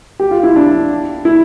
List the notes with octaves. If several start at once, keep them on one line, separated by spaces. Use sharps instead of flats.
G4
F4
E4
D4
E4